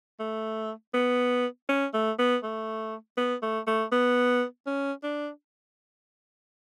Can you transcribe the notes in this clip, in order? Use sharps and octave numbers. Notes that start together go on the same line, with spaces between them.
A3
B3
C#4
A3
B3
A3
B3
A3
A3
B3
C#4
D4